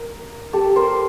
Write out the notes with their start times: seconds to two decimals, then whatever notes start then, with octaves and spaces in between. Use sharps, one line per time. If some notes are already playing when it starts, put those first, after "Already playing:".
Already playing: A#4
0.53 G4 A4
0.76 A#4 C5